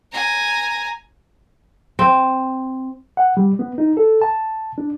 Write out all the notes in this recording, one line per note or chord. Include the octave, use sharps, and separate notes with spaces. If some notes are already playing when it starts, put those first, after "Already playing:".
G#5 A#5
C4
F#5
G3
B3
D#4
A4
A5
D4